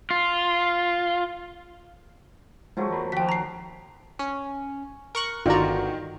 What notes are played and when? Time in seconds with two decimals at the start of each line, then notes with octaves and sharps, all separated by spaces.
0.10 F4
2.77 F3 F#3 G#3 A3 G#4
2.90 E2 A#4 B5
3.12 D#2 F3 F#4 C5 G5 B6
3.29 A#5 C7
4.19 C#4
5.15 A#4 C#6 F#6
5.46 G1 D#3 F4 F#4 D5 A#5